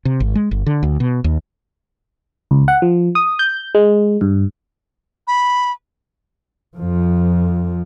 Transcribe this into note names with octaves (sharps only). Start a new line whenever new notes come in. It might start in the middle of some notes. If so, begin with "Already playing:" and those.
C3
G#1
G#3
G1
D3
D2
B2
D#2
C#2
F#5
F3
D#6
G6
G#3
G2
B5
F2 F3